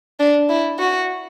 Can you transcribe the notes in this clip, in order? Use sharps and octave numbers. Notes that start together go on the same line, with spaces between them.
D4
E4
F#4